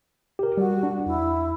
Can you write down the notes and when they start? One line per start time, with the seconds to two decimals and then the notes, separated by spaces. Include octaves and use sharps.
0.39 G4 A#4
0.57 G3 F#4
0.83 D4
1.06 E2 E4